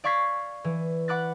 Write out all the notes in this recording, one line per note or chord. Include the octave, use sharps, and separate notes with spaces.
D5 F5 C#6 G#6 B6 C7
E3
F#5 B5 D6 F#6 A6